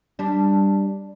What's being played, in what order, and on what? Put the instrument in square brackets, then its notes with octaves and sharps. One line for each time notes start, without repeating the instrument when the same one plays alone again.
[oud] G3 D4